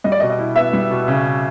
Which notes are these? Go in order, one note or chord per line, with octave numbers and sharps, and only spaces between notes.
G3 D#5
D5
B2 D#5
D#5
E4
B3 E5
G3
B2
C#3